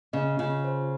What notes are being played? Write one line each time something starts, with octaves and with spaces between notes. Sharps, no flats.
C#3 D#5
C#3 F4
C5